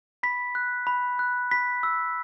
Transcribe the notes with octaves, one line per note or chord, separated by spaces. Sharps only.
B5 B6
F#6
B5
F#6
B5 B6
E6